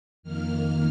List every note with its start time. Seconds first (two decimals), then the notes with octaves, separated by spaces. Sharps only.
0.23 F2 D#3 A#3 F6